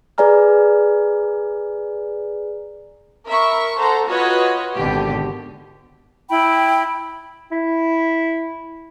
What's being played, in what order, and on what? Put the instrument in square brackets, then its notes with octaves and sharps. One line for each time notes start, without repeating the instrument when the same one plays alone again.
[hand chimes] G#4 B4 D5 G#5 A#5 F6
[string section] A#4 E5 B5 C#6
A4 C5 F#5 A#5
F4 F#4 B4 C#5 D#5
G#1 B2 D3 G4
[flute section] E4 G5 B5
[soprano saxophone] E4